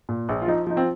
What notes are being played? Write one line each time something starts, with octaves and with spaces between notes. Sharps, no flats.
A#2
A#1
F4
F3 D#4
F3 D#4
C4 F4